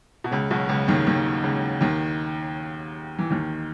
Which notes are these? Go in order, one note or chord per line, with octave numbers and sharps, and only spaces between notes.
B2
C#2 C#3
B1 B2
C#2 C#3
D#2 D#3
D#2 D#3
C#2 C#3
D#2 D#3
E3
D#2 D#3